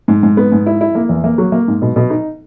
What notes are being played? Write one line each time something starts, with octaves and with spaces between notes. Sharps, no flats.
G#2
G#2
B3
G#2
E4
E4
A#3
E2
A#3
F#3
A#3
G#2
B2
B2
D#4